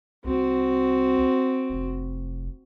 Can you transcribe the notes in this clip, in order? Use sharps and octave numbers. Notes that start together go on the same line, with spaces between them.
C2 C4 F#4
F1